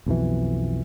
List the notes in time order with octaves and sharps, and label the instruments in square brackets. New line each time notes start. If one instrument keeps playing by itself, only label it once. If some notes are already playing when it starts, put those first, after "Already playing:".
[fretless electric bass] B1 F2 B2 E3